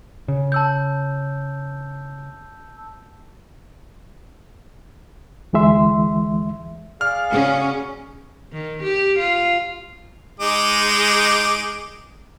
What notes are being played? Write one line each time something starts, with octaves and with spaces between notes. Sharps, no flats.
C#3
A5 E6 G6
D2 E3 G#3 E5 C6
G#4 D5 F5 F6
C#3 C#4 F#4
D#3
G4
F4
G#3 D#4 D6